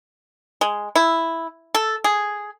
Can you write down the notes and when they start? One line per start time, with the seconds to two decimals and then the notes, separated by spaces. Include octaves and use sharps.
0.61 G#3
0.96 E4
1.75 A4
2.04 G#4